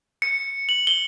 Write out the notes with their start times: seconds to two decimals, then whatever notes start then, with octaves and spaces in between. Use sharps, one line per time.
0.22 C#7
0.69 F#7
0.87 G7